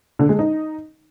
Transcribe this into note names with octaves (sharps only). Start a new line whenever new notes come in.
D3
G#3
D#4